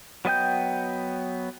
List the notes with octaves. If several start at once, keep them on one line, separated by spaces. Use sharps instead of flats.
F#3 B3 D#5 G5 G6